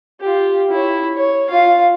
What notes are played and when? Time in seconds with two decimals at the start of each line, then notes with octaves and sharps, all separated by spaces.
0.21 F4 G4
0.71 E4 C#5
1.14 C#5
1.49 F4 F5